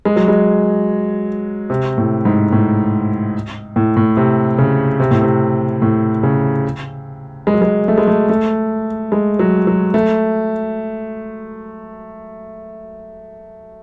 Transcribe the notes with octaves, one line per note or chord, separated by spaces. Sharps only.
G#3
F#3
G#3
C3
A2
G#2
A2
A2
A2
C3
C#3
C3
A2
C3
A2
C#3
G#3
F#3
G#3
A3
G#3
A3
A3
G#3
F#3
F#3
A3